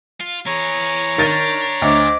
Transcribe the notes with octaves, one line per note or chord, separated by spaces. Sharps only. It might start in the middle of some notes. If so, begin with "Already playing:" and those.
F4
E3 G#4 C#5 A#5
D#3 D4 A6 D#7
D2 C5 D#5 D6